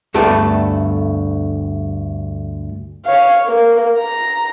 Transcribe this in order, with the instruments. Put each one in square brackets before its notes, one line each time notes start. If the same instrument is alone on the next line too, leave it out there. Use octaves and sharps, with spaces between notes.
[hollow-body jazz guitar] D2 G2 A3 B3 A4 G5
[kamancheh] C#5 F5
A#3
A#5